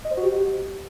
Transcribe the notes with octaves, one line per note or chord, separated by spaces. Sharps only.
D#5
C5
F#4
G4